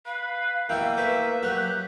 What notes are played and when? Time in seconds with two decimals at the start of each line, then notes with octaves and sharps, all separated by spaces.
0.06 B4 F5
0.69 B2 E3 A#3 G5 E6
0.97 A3 B4 E5
1.43 F#3 G4 F#6